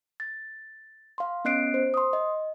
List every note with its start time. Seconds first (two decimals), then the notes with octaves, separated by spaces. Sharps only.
0.20 A6
1.18 F5 C6
1.45 B3 C#4 D#5 F#6 C7 D7
1.74 C5
1.94 C6 D#6
2.13 D#5